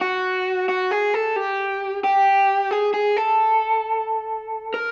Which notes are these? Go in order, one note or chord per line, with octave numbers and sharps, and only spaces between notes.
F#4
F#4
G#4
A4
G4
G4
G#4
G#4
A4
A#4